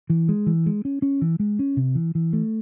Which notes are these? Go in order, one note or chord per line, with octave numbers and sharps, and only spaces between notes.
E3
G#3
E3
G#3
C#4
C#4
E3
G#3
C#4
C3
E3
E3
A3